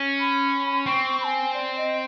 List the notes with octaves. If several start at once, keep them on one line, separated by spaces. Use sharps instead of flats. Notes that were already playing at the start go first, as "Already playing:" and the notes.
Already playing: C#4
B5
C4 C#6
B5
G#5
D5
D#5